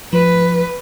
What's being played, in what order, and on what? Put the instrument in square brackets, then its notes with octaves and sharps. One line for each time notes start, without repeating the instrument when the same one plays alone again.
[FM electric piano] F3 [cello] B4